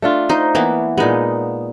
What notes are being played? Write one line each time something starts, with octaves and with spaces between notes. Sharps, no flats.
A3 D4 F4
D#4 C5
E3 A#3 B3 E4
A#2 G#3 B3 D#4